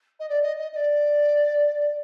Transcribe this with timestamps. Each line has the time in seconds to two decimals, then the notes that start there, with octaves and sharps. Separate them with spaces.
0.20 D#5
0.29 D5
0.42 D#5
0.58 D#5
0.72 D#5
0.76 D5